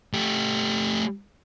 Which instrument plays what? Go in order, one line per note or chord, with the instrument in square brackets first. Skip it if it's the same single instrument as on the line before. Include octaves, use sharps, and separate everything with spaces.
[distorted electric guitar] A3 G4